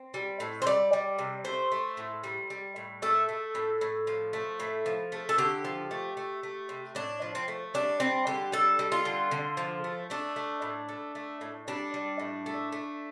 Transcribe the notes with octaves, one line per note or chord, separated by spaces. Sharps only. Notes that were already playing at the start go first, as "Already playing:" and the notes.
Already playing: C4
G3
A2
C5
G3 D5
G3
C3
A3 C5
A3
A2
G3
G3
A2
A3 A4
A3
A2
A2
F3
A3
A2
F3
A3
A4
D3 G4
F3
A3
A3
A3
C3
A2 D4
F3
C4
A3
G3 D4
G3 C4
D3 G4
G3 A4
G3
F4
D3
D3
F3
A3
A3 D4
A3
A2
A3
A3
A2
G3 D4
G3
A2
A3
A3